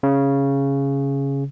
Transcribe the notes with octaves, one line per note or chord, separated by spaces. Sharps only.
C#3